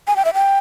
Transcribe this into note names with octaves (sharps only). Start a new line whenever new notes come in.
G#5
G5
E5
G5